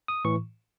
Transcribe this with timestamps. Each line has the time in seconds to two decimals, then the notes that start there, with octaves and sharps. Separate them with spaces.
0.08 D#6
0.25 A2 E3 C#6